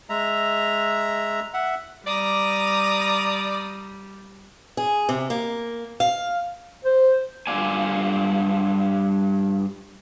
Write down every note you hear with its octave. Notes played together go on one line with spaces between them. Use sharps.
G#3 E5 A#5
E5 F#5
G3 D5 A#5 D#6
G#4
C3
A#3
F5
C5
G2 C3 F4 D5 G#5